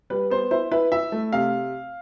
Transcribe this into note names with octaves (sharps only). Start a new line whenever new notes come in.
G3 B4
B3 C5
E4 C5
E4 B4
E4 E5
A3
C3 F5